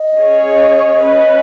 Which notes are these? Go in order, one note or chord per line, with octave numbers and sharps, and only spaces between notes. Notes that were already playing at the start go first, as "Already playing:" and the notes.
Already playing: D#5
C#4 G#4 C#5
C#4 B4